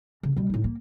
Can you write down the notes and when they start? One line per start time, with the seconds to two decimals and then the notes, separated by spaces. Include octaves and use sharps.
0.23 C#3
0.37 B2 G3
0.50 A2 D#4
0.64 A#3